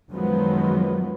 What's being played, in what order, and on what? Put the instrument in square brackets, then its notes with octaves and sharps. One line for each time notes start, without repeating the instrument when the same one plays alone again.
[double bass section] F#2 D#3 F3 F#3 G#3 B3